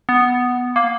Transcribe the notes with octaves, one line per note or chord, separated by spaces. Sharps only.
B3
A#3